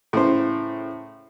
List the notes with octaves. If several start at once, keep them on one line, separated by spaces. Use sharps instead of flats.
A2 C#3 C5